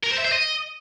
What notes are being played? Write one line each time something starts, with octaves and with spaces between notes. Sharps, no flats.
A#4
C5
E5
C5
D#5